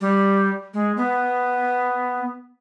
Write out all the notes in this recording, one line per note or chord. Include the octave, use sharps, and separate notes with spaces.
G3
G#3
B3